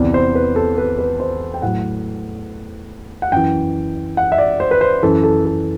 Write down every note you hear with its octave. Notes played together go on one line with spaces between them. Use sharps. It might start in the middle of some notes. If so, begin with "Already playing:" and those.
Already playing: E2 C3 E3 D5
C5
B4
A4
B4
B4
C5
G5
A2 F#3 F#5
F#5
F#2 E3 G5
F#5
E5
D5
C5
B4
C5
F#2 E3 A4
A4
A4